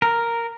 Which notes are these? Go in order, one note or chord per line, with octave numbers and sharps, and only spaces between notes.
A#4